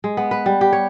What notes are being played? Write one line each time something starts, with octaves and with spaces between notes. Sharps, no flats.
G#3
B3
B4
G3
G4
C#5